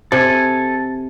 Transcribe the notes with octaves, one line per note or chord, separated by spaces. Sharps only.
C3 A4 G#5